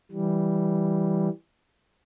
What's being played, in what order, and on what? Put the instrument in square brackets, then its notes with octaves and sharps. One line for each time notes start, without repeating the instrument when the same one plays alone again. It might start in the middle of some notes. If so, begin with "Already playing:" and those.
[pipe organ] E3 G3